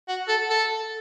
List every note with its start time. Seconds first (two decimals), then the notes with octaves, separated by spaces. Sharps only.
0.08 F#4
0.28 A4
0.50 A4